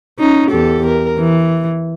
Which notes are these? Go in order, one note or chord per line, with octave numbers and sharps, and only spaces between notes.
C#4 D#4
E2 G4 A4
A#4
E3